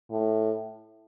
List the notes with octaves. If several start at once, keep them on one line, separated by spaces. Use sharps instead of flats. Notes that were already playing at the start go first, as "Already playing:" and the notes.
A2